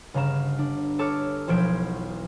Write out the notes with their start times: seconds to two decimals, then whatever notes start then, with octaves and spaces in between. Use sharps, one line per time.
0.14 G1 C#3 F5 A#5 E7
0.59 D4
0.99 A4 C#5 A5 D6 F6 C#7
1.48 E1 B1 F3 C5 G#6 D7